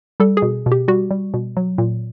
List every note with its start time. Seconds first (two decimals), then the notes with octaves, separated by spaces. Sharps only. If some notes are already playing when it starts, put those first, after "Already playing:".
0.20 G3 A4
0.37 G#4
0.42 B2
0.66 B2
0.72 G4
0.88 G3 F#4
1.11 G3
1.34 B2
1.57 F#3
1.78 A#2